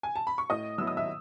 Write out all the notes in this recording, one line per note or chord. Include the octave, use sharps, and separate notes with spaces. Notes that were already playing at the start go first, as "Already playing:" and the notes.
G#5
A5
B5
C#6
A2 D#5 D#6
F#3 B3 E4 E6
D#6
E5 E6